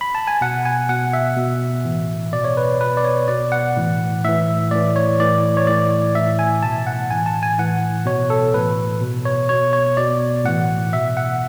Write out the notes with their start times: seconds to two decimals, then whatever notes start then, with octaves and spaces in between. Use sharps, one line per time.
0.01 B5
0.15 A5
0.27 G#5
0.41 B2 F#5
0.65 G#5
0.89 B2 F#5
1.13 E5
1.37 B2
1.85 A2 E3
2.33 B2 D5
2.44 C#5
2.57 B4
2.80 B2 B4
2.97 D5
3.04 C#5
3.28 B2 D5
3.52 F#5
3.77 A2 E3
4.24 A2 E3 E5
4.71 A2 E3 D5
4.96 C#5
5.19 A2 E3 D5
5.57 C#5
5.67 A2 E3 D5
6.15 A2 E3 E5
6.39 G#5
6.63 B2 A5
6.87 F#5
7.10 A2 E3 G#5
7.26 A5
7.43 G#5
7.58 A2 E3 F#5
8.06 B2 C#5
8.30 A4
8.54 A2 E3 B4
9.01 B2
9.25 C#5
9.49 B2 C#5
9.73 C#5
9.97 B2 D5
10.45 A2 E3 F#5
10.93 B2 E5
11.17 F#5